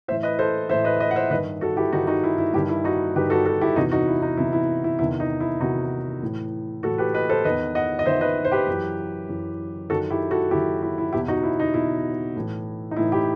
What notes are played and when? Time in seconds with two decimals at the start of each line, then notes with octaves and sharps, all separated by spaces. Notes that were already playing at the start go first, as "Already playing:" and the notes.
0.08 A2 E3 C5 E5
0.23 B4 D#5
0.39 A4 C5
0.69 A2 E3 C5 E5
0.85 B4 D#5
0.97 E5
1.00 B4 D#5
1.11 F#5
1.16 C5 E5
1.31 G2 D#3 B4 D#5
1.61 F#4 A4
1.77 E4 G4
1.92 G2 D#3 D#4 F#4
2.07 D#4 F#4
2.24 E4
2.38 E4
2.53 G2 E4 G4
2.58 D#3
2.69 E4
2.84 D#4 F#4
3.16 G2 D#3 G4 B4
3.30 F#4 A4
3.46 F#4 A4
3.61 E4 G4
3.76 E2 C3 E3 D#4 F#4
3.92 D#4 F#4
4.07 E4
4.22 D#4
4.37 E2 C3 E3 E4
4.53 E4
4.84 E4
4.99 E2 C3 D#3 E4
5.20 D#4
5.40 E4
5.60 E2 C3 D#3 D#4 F#4
6.22 A2 E3
6.83 A2 E3 F#4 A4
6.98 G4 B4
7.14 B4 D#5
7.29 A4 C5
7.44 E2 D#3 B4 D#5
7.75 D#5 F#5
7.99 D#5
8.06 E2 D#3 C5 E5
8.21 B4 D#5
8.45 C5
8.52 G4 B4
8.67 F#2 E3
9.29 F#2 E3
9.90 F#2 D#3 F#4 A4
10.10 E4 G4
10.31 F#4 A4
10.51 F#2 E4 G4
10.55 D#3
10.83 E4
10.98 E4
11.13 E2 B2 E4 G4
11.28 D#4 F#4
11.43 E4
11.60 D#4
11.74 E2 B2 E4
12.36 A2 E3
12.91 D#4
12.96 A2 E3 E4
13.12 E4 G4